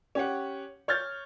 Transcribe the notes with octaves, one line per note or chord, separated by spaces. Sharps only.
C#4 G4 F#5
C#5 F6 G6 A6